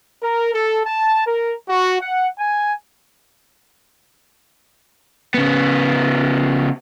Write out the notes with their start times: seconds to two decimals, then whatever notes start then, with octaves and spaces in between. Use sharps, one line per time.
0.22 A#4
0.54 A4
0.85 A5
1.27 A#4
1.69 F#4
2.01 F#5
2.38 G#5
5.34 C#3 B3